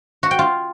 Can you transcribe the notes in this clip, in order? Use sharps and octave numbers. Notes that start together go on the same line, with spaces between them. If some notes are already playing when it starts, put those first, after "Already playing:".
F#4
G5
F4